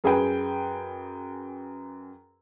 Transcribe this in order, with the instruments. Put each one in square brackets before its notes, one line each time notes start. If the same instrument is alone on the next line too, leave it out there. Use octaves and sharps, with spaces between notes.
[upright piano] F#2 G#4 B4 G5